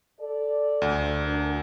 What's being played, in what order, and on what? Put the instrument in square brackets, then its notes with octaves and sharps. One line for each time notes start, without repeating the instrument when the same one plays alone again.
[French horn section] A4 D5
[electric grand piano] D2
[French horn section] D4 F#4 A#4